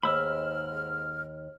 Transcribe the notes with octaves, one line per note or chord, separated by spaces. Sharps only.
D#2 G#2 B5 E6 F6